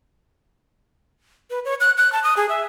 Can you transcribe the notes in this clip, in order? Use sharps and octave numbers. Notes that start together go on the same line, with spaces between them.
B4
C#5
F#6
F#6
A5
D#6
G#4
E5